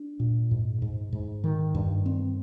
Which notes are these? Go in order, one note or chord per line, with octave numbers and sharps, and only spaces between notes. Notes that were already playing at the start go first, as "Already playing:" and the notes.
Already playing: D4
A#2
G#2
G#2
G#2
D#3
G2
C4